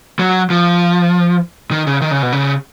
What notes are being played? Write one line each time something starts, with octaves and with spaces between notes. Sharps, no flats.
F#3
F3
D#3
C#3
D#3
C#3
B2
C#3